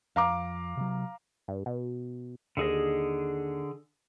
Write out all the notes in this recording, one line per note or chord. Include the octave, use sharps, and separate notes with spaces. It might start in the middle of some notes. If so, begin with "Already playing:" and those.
F2 F5 A#5 D6
C3 F#3
G2
B2
D#2 D3 G#4 D#5